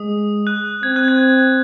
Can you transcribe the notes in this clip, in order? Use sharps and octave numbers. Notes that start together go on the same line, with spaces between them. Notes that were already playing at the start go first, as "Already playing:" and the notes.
Already playing: G#3 D#6
F#6
C4 G#6
F#6
G#6